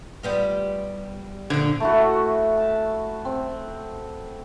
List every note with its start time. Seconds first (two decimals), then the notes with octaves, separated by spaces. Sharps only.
0.23 G3 B3 F4
1.50 A#2 D3 F3
1.80 A3 E4 F#4
2.57 A5
3.25 C4